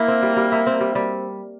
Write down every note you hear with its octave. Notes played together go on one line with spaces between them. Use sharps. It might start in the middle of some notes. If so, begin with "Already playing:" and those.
Already playing: A#3 E4
C4
G3
G3
E4
C4
G3
G3